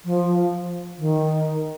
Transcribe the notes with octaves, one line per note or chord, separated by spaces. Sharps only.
F3
D#3